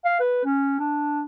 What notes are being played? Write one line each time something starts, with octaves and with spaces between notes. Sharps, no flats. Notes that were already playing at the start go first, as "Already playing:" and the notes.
F5
B4
C#4
D4